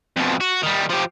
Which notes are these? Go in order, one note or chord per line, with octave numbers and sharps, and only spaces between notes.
F2 B2
F#4
D#3 G3
F3 G4